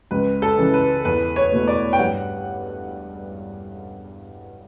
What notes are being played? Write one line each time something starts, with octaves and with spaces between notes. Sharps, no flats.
C#2 B4
A4
C#3 E3
B4
E2 B4
C#5
B2 A3
D5
G5
G2 F#5